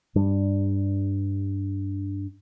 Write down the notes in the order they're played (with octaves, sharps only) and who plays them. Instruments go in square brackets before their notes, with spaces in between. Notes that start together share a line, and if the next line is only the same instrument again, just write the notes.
[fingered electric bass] G2 G3 D4